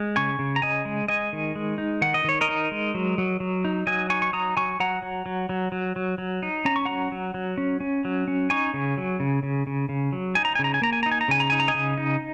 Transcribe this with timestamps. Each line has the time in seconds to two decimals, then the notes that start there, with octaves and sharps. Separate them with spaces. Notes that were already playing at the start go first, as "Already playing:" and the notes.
Already playing: G#3
0.16 C#3 G#5 C#6
0.39 C#3
0.56 A#5
0.62 C#3 D#5 G#5
0.85 G#3
1.08 G#3 D#5 G#5
1.33 D#3
1.56 G#3
1.78 D#4
2.02 D#3 F#5
2.14 D#5
2.24 D#3 C#5
2.41 A#4 D#5
2.49 D#4
2.72 G#3
2.95 F#3
3.18 F#3
3.40 F#3
3.65 D#4
3.87 F#3 D#5 G#5
4.10 D#4 G#5 C#6
4.22 C#6
4.33 F#3 A#5 D#6
4.57 F#3 G#5 C#6
4.80 F#3 F#5 A#5
5.02 F#3
5.26 F#3
5.49 F#3
5.72 F#3
5.96 F#3
6.18 F#3
6.43 D#4
6.65 C#4 A#5
6.76 C#6
6.85 F#3 F#5 A#5
7.12 F#3
7.34 F#3
7.58 C#4
7.80 C#4
8.05 F#3
8.28 C#4
8.50 D#4 G#5 C#6
8.74 C#3
8.97 F#3
9.20 C#3
9.43 C#3
9.67 C#3
9.89 C#3
10.13 F#3
10.35 D#4 G#5
10.45 A#5
10.55 G#5
10.59 C#3
10.64 A#5
10.74 G#5
10.82 A#3 A#5
10.93 G#5
11.03 D#4 A#5
11.12 G#5
11.21 A#5
11.28 C#3 G#5
11.40 A#5
11.50 D#4 G#5
11.60 A#5
11.68 D#5 G#5
11.74 C#3
11.98 D#4